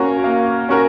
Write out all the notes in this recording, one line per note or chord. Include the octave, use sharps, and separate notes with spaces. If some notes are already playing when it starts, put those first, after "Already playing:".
Already playing: A#3 C#4 F#4 A#4
A#3
C#4 F#4 A#4